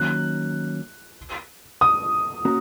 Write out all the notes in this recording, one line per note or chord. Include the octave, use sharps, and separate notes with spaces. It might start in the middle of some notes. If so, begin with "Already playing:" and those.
Already playing: D#3 F#3 A#3 C#4 F#6
D#6
A#3 C#4 F#4 A#4